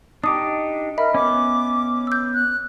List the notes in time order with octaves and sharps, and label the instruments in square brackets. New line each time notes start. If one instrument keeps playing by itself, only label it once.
[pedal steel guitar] D4 D#4 G4 [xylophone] D6 D#6
[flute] A#4 [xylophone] D#5 E5 B5
[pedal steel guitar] B3 C#4 [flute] D6
[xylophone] E6 G6
[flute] F#6